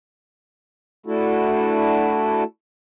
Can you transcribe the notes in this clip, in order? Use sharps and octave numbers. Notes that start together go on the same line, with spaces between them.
A3 D4 E4 F#4 A4